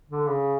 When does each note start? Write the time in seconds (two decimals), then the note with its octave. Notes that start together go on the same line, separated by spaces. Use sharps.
0.09 D3
0.27 C#3